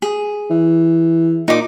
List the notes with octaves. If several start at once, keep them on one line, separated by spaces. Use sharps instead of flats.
G#4
E3
A#2 D#4 D6